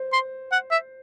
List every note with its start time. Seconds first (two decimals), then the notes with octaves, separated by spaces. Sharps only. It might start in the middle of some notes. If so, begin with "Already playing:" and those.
Already playing: C5
0.13 C6
0.52 F#5
0.71 E5